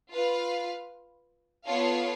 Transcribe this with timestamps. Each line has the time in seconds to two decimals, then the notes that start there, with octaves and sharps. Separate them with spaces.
0.11 F4 B4 F5
1.65 B3 F4 A4 C#5 F5